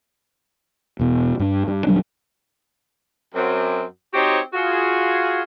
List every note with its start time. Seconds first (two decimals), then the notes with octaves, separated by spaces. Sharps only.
0.99 E1 B2
1.39 G2 D4
1.68 G2
1.87 D#1 F#3 G3 D4
3.35 F#2 C4
4.14 C4 D#4 F#4 G4 C5 C#5
4.53 F4 F#4 G#4